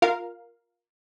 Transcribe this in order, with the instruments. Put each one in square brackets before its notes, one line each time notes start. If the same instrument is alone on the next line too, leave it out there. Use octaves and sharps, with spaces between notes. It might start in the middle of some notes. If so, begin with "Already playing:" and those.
[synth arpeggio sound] F4 A#4 F5